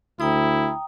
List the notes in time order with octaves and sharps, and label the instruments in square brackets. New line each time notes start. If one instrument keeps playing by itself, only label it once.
[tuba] D2 [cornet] E4 [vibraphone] G5 A#5 D#6